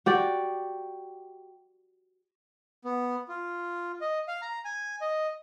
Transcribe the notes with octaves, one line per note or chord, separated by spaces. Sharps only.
F#4 G4 D5
B3
F4
D#5
F5
A#5
G#5
D#5